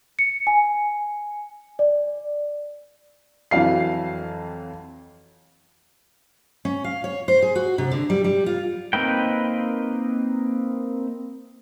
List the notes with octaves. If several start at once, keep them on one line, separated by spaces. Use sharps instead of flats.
C#7
G#5
D5
F2 E3 F#3 F5 C7
C#4
F5
C#5
C5
G#4
F#4
C3
D3
G3
G3
F4
A#3 C4 D#4 B4 G5